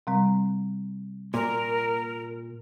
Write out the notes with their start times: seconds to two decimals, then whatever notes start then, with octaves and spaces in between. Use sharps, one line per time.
0.07 C3 G3 C4
1.34 A#2 A#4